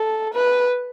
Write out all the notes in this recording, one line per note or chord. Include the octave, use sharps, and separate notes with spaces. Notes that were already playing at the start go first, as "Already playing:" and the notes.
Already playing: A4
B4